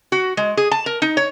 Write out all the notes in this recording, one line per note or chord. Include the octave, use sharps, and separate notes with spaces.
F#4
G#3
G#4
A5
A#4
D#4
C#5